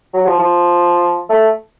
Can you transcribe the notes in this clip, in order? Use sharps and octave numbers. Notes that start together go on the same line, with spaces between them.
F#3
F3
F3
A3